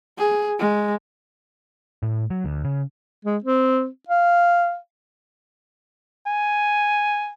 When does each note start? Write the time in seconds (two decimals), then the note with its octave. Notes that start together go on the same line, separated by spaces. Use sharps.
0.18 G#4
0.59 G#3
2.03 A2
2.30 F#3
2.45 D2
2.65 C#3
3.25 G#3
3.44 C4
4.09 F5
6.27 G#5